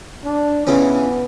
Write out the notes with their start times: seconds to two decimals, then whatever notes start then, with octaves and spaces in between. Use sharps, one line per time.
0.25 D4
0.67 C#3 E3 B3 C#4